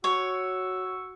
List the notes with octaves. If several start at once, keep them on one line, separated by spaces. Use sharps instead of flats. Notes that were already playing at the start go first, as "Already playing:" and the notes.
F#4 C#5 C#6 E6